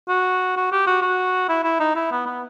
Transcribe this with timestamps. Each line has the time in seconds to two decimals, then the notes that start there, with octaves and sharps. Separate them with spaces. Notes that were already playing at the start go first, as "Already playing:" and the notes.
0.09 F#4
0.57 F#4
0.72 G4
0.87 F#4
1.02 F#4
1.49 E4
1.64 E4
1.80 D#4
1.96 E4
2.12 B3
2.26 B3